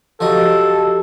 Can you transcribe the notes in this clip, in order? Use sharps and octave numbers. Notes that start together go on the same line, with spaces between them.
F3 F#3 G4 A4 D#5